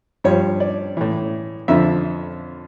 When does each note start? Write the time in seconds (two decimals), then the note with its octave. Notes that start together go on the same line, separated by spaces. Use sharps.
0.24 G2 F3 C#5
0.60 D5
0.97 A2 E3
1.68 F2 D3 F3 E5